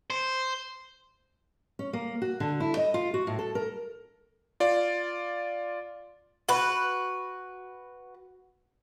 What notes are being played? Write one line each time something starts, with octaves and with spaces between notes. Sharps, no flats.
C5
C#4
A#3
F#4
D3
E4
D#5
F4
F#4
A2
A4
A#4
F4 D5
F#4 B4